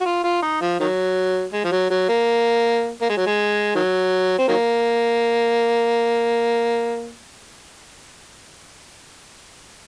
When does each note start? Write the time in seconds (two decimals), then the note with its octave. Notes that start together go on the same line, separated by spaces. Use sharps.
0.01 F#4
0.05 F4
0.24 F4
0.43 D#4
0.61 F3
0.80 D#3 F#3
1.53 G#3
1.64 F3
1.72 F#3
1.90 F#3
2.09 A#3
3.01 A#3
3.09 G#3
3.17 F#3
3.26 G#3
3.75 D#3 F#3
4.38 C4
4.48 D#3 F#3 A#3